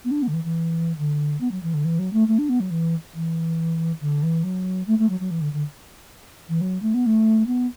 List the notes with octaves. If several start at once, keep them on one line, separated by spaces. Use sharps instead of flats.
B3
D4
B3
D3
E3
E3
D3
B3
F#3
E3
D3
E3
F#3
A3
A3
D4
B3
F#3
E3
E3
D3
E3
F#3
A3
A3
F#3
F#3
E3
D3
D3
E3
F#3
A3
B3
A3
B3